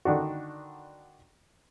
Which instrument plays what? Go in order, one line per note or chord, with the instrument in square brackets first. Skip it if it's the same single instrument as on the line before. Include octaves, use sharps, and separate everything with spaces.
[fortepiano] D3 D#3 D4 F#4